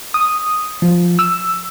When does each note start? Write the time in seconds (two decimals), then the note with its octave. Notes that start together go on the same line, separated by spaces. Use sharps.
0.14 D#6
0.82 F3
1.19 E6